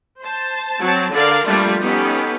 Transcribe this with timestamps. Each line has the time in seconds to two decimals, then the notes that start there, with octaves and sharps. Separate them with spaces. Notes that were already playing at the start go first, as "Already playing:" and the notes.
0.22 C5 A5
0.81 F#3 C4 A5
1.13 D3 A4 A#4 D5 F5
1.45 F3 G3 A3 A#3 D4 F4
1.81 B3 C#4 D#4 G4 A4